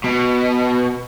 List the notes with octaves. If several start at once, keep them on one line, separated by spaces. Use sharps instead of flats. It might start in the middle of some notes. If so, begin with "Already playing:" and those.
B2